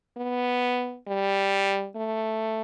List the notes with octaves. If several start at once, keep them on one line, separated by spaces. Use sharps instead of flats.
B3
G3
A3